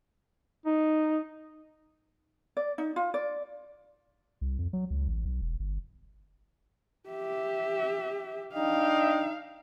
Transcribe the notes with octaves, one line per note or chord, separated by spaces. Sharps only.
D#4
D5
D#4
F4
D5
C2
F2
F#3
C#2
A1
B1
E1
G1
G4 E5
D4 D#4 D#5 F5 G5